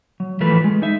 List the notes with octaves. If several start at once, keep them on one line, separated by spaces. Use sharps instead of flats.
F#3
E3 F3 A3 B4
G#3
D#4 E5